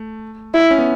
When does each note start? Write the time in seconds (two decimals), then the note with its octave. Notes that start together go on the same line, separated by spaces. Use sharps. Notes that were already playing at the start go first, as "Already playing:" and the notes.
Already playing: A3
0.54 E4
0.71 C#4
0.79 B3